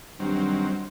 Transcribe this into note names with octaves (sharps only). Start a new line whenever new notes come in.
G2 D#3 F#3 C4